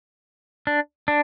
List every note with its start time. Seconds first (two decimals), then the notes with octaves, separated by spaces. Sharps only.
0.67 D4
1.08 D4